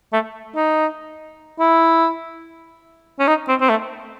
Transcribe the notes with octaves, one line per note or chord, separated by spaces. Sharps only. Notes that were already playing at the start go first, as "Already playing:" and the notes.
A3
D#4
E4
C#4
D#4
C4
C4
A3